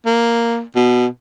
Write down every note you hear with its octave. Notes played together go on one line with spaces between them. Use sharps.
A#3
B2